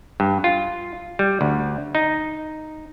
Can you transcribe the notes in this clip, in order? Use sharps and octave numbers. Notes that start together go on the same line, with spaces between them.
G2
F4
G3
D2
D#4